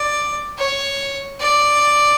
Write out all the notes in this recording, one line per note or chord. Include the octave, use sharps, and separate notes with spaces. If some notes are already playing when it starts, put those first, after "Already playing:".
Already playing: D5
C#5
D5